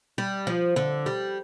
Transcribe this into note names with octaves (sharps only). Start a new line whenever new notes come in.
G3
F3
D3
G3